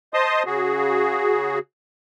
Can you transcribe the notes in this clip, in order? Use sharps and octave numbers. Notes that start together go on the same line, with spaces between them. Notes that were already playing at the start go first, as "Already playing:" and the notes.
C5 D#5 A5 C6 D#6
C#3 F#4 G#4